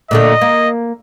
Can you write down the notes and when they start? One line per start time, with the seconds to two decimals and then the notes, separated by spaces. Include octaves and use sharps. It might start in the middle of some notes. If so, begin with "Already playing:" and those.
0.11 A#2 D3 A3 D#5
0.41 A#3